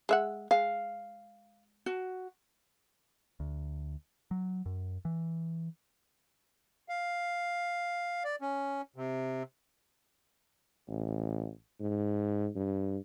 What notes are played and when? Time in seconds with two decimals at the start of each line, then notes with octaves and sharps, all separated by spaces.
0.09 G#3 E5 F#5
0.51 G#3 F5
1.86 F#4
3.40 D2
4.31 F#3
4.66 F#2
5.05 E3
6.89 F5
8.24 D5
8.41 C#4
8.96 C3
10.88 A1
11.80 G#2
12.56 G2